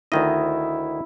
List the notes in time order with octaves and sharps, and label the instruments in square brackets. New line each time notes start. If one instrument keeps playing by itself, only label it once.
[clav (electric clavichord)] D2 D#3 D#5 [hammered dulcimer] E4